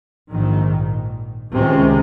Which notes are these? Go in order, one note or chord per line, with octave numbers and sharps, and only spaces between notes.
A#1 G#2 D#3
C#2 C3 D#3 G#3 C#4